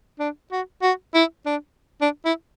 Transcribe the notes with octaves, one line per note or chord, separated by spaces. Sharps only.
D4
F#4
F#4
E4
D4
D4
E4